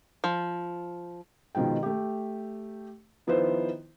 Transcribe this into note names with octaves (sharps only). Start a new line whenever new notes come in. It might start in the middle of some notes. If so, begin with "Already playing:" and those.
F3
B2 D#3 F3 G#3 G5
A3 G4
D#3 F3 B3 E4 B4 C5